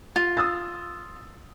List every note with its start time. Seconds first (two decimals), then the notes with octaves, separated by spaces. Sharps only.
0.16 F4
0.37 D#6 E6 A6